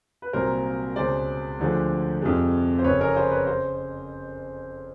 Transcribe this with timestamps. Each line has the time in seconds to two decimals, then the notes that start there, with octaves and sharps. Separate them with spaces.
0.22 B4
0.33 C2 A#2 F#3 A#3 A#4 C5
0.96 C#2 B2 G#3 C5 D5
1.59 D2 D3 F3 G#3
2.22 F2 C3 F3 G#3
2.79 C5
2.84 F#1 F2 C#3 B4 C#5
3.00 G#4 A#4
3.16 A#4 C5
3.31 B4 C#5
3.47 C#3 C5